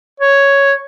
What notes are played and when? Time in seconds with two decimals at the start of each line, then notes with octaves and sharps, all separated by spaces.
0.20 C#5